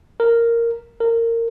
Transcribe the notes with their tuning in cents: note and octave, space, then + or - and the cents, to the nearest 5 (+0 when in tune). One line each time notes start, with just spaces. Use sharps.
A#4 -5
A#4 -20